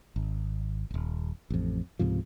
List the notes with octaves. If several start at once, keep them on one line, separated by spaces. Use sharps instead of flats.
G#1
D#1 G#1
A1 F2
C#2 G#2 C3 F3